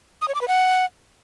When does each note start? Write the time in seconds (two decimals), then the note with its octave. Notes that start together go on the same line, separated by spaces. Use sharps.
0.21 D#6
0.28 C#5
0.35 D6
0.41 B4
0.48 F#5